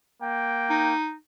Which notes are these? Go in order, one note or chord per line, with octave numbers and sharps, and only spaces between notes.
A#3 G5
D#4